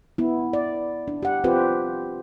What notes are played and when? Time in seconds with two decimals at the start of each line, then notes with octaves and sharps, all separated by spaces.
0.18 B3 E4
0.53 D5
1.08 D4
1.23 G4 F#5
1.44 C4 F4 G4 B4 C5